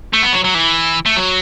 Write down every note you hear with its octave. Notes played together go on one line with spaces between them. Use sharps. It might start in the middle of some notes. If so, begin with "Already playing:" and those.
A3
B3
F#3
F#3
E3
A3
F#3